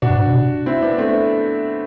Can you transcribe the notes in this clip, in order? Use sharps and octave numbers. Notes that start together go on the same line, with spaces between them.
B2 D4 F#4
G2
B2
C3
C4 E4
B3 D4
A3 C4